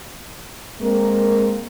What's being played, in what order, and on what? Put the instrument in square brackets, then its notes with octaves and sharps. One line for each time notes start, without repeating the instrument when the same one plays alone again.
[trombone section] G#3 A#3 [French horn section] C4 A#4